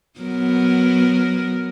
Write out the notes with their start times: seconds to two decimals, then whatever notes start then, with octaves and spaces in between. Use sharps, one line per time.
0.19 F#3 B3 A#4